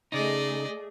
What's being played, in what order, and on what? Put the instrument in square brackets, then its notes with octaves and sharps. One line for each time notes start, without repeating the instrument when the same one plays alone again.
[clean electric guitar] C#3 D#4 [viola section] A3 G#4 [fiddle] D5 D#5